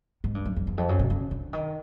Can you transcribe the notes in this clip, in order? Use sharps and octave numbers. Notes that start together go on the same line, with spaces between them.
G#2
G2
F#2
F2
E2
F2
F#2
C3
C#3
D3
D#3